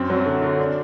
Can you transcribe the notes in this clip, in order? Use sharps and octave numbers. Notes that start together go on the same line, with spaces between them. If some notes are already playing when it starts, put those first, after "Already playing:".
Already playing: F#2 C4
F#3
D3
D3
D4